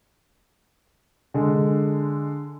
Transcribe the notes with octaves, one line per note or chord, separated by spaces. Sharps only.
D3 G#3